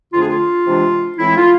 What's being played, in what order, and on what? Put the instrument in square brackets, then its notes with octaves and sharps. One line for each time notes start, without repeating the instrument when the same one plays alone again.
[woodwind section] F2 D3 A3 D4 F4
G#4
F4
C3 E3 G#3 D4
A2 E3 G#3 C4 E4
F4